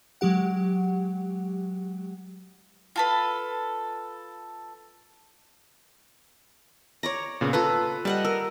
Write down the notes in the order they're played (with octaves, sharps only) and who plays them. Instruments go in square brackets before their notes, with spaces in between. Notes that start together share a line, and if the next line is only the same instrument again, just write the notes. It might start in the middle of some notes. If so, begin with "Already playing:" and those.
[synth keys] F#3 G#3 G4 F#5
[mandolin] F4 A4 B4
[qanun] C#5 D5 A#5
[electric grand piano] A#2 C#3 B3
[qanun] F4 A4 A#5 [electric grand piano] B4
[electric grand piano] G3 [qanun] D#5 F#5 A5
[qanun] A#4 [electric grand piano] E6